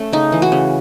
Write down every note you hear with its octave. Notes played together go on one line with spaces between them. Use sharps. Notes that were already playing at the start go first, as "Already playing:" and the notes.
Already playing: A3 C#4
C#3 D#4
E3
F#4
C#3